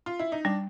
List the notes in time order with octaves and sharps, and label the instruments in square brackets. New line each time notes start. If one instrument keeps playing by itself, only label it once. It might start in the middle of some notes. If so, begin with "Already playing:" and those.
[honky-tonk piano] F4
E4
D#4
[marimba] G3 [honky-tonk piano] D4